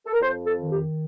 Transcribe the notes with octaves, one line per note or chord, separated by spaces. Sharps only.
A4
A#4
F2 C5
A4
D#3
G4